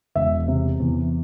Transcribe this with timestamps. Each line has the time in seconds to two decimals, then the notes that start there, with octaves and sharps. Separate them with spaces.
0.15 E1 E5
0.48 C3
0.80 E2